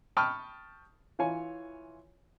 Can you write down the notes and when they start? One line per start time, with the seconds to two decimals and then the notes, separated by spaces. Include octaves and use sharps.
0.17 G5 A5 B5 C#6 D#6 F6
1.19 E3 F4 C#5 G#5